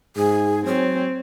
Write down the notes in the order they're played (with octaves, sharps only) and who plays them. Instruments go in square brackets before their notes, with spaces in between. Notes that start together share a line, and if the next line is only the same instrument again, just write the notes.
[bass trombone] G#2 [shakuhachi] G#4
[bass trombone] F#3 [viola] C4 [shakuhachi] C#5